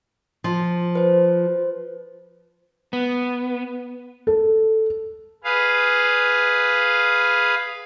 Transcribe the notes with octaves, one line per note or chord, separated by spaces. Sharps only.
F3
B4 C5
B3
A4
G#4 B4 F5